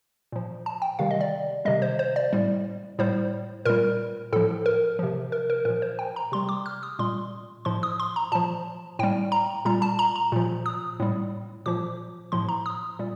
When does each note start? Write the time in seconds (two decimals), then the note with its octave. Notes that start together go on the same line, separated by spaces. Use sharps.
0.32 A#2 F3
0.66 A5
0.82 G5
0.99 C3 D#3 G3 F5
1.11 D#5
1.21 D5
1.65 C3 D#3 G3 D#5
1.82 C5
1.99 C5
2.16 D5
2.33 A2 G3
2.99 A2 G3 C5
3.65 A#2 G3 A#4
4.33 A2 F3 A4
4.66 A#4
4.99 C3 F3
5.32 A#4
5.50 A#4
5.65 A#2 F3 A#4
5.82 C5
5.99 G5
6.16 A#5
6.32 C3 G3 C6
6.49 D6
6.66 F6
6.83 D#6
6.99 A#2 G3 C6
7.65 A2 F3 C6
7.83 D#6
8.00 C6
8.16 A#5
8.32 A#2 F3 A5
8.99 A2 G3 G5
9.32 A#5
9.65 A#2 G3 A#5
9.82 A5
9.99 A#5
10.16 A#5
10.32 A#2 F3
10.66 D#6
11.00 A2 G3
11.66 A#2 F3 D6
12.32 A2 F3 C6
12.49 A#5
12.66 D#6
12.99 A#2 G3